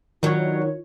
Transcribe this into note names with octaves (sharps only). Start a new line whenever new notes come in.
G2 D#3 F#3 F4 C#5